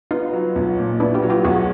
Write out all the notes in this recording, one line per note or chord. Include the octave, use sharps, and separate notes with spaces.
B3 D#4 F4
F#3
B1
A#2
B3 D4 E4
F4 G4
F#3
F4 G4
B1 F#4 G#4